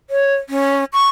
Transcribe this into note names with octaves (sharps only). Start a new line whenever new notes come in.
C#5
C#4
C#6